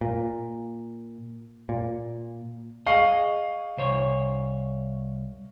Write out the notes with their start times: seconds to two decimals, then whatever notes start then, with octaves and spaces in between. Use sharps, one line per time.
0.01 A#2
1.69 A#2
2.87 G#4 D#5 F5 C#6 C7
3.77 C2 C5 C#5